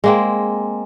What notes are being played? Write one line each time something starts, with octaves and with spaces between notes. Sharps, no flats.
G#3 A#3 C4